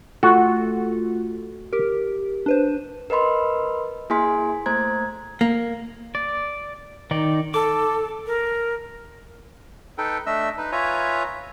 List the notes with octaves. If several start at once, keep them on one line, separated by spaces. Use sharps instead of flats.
A3 F4 F#4 A4
G4 A#4
D4 B4 C5
A#4 B4 D#5 B5 C6
A#3 E4 G#4 G#5 C6 B6
A3 A#3 C5 A#5 G#6
A#3
D5
D#3 D#4 D5
A4 D6
A#4
D#4 A4 B4 G5
A3 D4 D#5 E5 E6
D#4 B4
F4 B4 C#5 E5 G#5 A#5